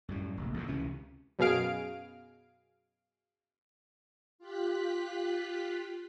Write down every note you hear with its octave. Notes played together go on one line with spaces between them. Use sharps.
F#2 A2 G3
F1 A#1
A#1 E2 D3
C#2 C3 E3 C#4
F#2 B2 G#4 F5 D7
F4 G4 F#6 B6